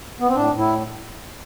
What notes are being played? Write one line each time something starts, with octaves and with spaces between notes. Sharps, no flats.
B3
C4
A2 D4
A2
E4